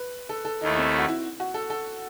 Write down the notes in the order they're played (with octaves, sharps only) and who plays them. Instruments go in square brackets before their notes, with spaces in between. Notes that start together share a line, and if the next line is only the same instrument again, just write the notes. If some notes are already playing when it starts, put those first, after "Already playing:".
Already playing: [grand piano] B4
A4
A4
[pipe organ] D#2 D#3 A3 E4 [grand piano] D#4
[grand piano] C4
F#4
E4
F#4
A4
A4